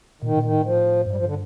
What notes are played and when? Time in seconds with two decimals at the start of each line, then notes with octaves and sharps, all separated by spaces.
0.22 A#2 D#3
0.36 A#2
0.43 D#3
0.50 A2
0.64 F3
1.05 G2
1.11 G3
1.16 F3
1.25 D3